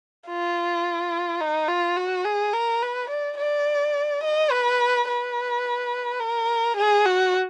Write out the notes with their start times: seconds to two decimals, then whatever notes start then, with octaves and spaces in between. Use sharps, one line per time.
0.28 F4
1.40 D#4
1.68 F4
1.97 F#4
2.25 G#4
2.53 A#4
2.82 B4
3.10 D5
3.38 D5
4.23 D#5
4.51 B4
5.08 B4
6.20 A#4
6.77 G#4
7.05 F#4